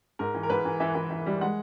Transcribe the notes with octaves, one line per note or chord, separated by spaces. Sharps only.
G#2 A#4
E3
A#4
G#2 B4
E3
E3 E5
E3
E3
G3
G#3 F#5